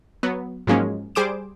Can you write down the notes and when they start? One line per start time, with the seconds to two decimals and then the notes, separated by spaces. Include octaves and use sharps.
0.23 F#3 B3
0.67 G#2 F3 F#3 G#3 A#3 C#4
1.15 G3 G#4 C5 D6 D7 E7